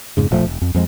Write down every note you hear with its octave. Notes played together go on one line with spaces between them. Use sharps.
F2 G#2 C#3
E1 A#2 F3 A3
E1
F2
F2 F3 G#3